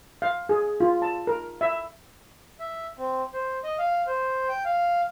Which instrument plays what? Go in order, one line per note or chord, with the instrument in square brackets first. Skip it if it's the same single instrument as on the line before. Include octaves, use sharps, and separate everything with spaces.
[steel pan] F5
G#4
F4
A5
A#4
E5
[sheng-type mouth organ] E5
C4
C5
D#5
F5
C5
G5
F5